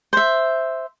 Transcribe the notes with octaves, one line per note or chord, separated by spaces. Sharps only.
C5 E5